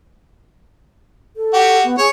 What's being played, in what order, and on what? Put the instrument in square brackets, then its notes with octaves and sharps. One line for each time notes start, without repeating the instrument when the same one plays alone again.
[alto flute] A4
[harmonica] F#4 G4
[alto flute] B3
[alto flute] G#4 [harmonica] C#5